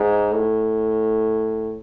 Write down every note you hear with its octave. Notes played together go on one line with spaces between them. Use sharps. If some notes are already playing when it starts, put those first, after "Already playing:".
Already playing: G#2
A2